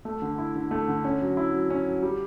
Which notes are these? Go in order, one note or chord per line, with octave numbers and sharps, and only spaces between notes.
A3
D3
E4
D3
A3
D3
C#4
F#3
E4
F#3
C#4
F#3
G3